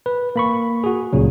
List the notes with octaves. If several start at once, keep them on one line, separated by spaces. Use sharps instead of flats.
B4
A#3 B5 C#6
F#4 G#4
C#2 A#2 C#3 F#3